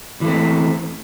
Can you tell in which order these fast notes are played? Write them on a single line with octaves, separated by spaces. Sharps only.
E3 A3 C4